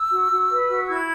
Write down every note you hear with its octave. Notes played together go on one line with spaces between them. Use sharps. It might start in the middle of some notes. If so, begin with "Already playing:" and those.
Already playing: E6
F#4
F#4
B4
F#4
E4 G#6